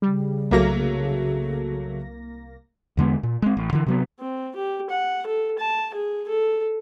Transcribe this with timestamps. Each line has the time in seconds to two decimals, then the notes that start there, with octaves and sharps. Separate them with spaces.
0.02 C#3 G3
0.51 C2 F#3 A3 A#3 A#6
2.97 E2 D3 G#3 B3
3.23 A#2
3.42 G#3 C4
3.57 A1
3.73 D3 E3
3.86 C3 F#3 B3
4.19 C4
4.56 G4
4.90 F#5
5.27 A4
5.59 A5
5.94 G#4
6.29 A4